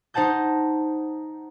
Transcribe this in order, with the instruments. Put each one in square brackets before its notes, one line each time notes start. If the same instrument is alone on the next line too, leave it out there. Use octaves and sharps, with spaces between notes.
[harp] D#4 C5 F#5 A5 G6